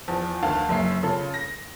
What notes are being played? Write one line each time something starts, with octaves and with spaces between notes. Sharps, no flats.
E2 F3
D2 D#3 F5 A5
F#1 F#2 E5 C7
C#3 F4 A4
A#6